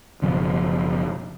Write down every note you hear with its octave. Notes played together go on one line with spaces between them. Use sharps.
F#1 B2 F3